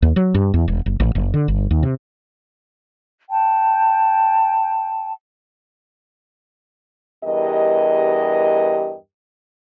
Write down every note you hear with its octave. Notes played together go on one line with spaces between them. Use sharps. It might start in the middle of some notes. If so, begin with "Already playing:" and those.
D#2
F#3
G2
E2
E1
F#1
A1
F#1
D3
G1
D#2
C3
G5 A5
E2 G2 G4 A#4 D#5